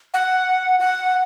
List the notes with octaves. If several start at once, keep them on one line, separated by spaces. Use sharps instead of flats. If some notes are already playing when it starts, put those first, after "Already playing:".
F#5
F#5